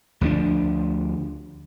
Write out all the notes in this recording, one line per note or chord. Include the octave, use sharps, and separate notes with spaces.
D2 F3 G3 D4